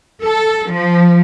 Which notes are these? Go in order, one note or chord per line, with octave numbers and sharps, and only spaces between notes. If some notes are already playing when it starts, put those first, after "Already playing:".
A4
F3